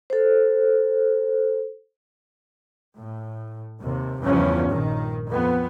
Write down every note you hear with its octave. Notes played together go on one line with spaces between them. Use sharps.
A4 C5
A2
D#2 C3
E2 G2 C#3 F3 C#4
A#1 D#3
F2 B3